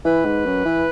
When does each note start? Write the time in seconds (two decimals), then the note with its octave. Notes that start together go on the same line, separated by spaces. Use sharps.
0.05 E3 B4
0.25 G#2
0.46 F#2
0.65 E3